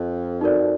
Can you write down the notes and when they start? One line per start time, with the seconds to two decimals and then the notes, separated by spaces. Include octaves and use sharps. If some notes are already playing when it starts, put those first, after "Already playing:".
Already playing: F2
0.41 D#4 F#4 A#4 D5